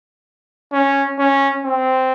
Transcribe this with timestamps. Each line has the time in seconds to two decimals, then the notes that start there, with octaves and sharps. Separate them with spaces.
0.73 C#4
1.19 C#4
1.65 C4